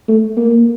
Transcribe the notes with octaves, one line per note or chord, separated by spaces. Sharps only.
A3
A#3